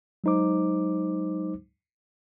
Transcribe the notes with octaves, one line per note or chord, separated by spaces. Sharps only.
F#3 G#3 D#4 C5 D6